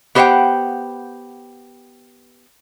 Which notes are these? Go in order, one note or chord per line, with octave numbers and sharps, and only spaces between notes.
B3 G4 C5 D#5 F#5 G5